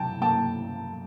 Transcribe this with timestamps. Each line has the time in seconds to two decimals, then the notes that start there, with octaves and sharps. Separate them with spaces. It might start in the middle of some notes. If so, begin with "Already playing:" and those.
Already playing: F#3 G5 A5
0.21 A#3 G5 A5